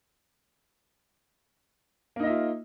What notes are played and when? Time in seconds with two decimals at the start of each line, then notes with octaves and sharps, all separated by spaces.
2.16 A#3
2.19 D#4
2.23 D#5
2.26 E5
2.29 F4